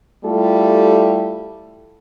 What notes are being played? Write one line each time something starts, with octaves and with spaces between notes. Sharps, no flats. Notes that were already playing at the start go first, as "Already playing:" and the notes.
G3 A3 E4 F4 G4 A4